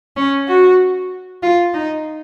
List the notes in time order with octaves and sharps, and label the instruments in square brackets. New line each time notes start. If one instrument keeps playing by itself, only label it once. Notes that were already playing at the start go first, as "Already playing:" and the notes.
[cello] C#4
F#4
F4
D#4